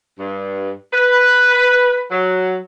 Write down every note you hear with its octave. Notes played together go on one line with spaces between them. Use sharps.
G2
B4
F#3